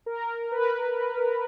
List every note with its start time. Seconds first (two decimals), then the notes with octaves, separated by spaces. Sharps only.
0.06 A#4
0.51 B4